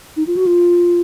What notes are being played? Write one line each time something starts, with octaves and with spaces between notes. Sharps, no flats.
D#4
F4
F#4
F4